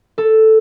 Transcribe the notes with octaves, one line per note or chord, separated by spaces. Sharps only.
A4